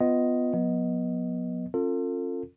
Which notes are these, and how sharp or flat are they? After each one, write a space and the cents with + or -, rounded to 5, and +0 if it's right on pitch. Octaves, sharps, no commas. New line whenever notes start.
B3 +15 F4 +0 D#5 +0
F3 +45 B3 -20 D#5 +0
C#4 -40 F4 +10 A4 +35